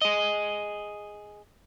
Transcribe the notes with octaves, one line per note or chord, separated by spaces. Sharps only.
G#4 D#5